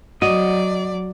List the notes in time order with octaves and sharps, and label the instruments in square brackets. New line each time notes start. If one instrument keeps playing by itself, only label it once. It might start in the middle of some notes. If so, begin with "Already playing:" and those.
[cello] F#3 D5 [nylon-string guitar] F#4 [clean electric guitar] D#5